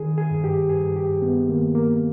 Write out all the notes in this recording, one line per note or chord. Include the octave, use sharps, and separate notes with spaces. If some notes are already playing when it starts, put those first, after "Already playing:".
Already playing: D#3 G#4
G#4
G2
G4
G2 G#4
G4
G2
B3
D#3 A#3
A#3
G2